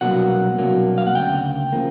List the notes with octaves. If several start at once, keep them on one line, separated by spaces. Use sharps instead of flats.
C2 B2 F#3 A#3 D4 F#5
C2 B2 F#3 A#3 D4
F5
F#5
D2 C#3 G5
C#3 F3 A#3